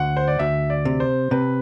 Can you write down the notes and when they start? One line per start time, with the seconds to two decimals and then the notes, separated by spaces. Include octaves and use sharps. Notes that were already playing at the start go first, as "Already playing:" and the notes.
Already playing: D2 F#5
0.17 C5
0.28 D5
0.39 D2 E5
0.70 D5
0.85 C3
1.00 C5
1.31 C3 B4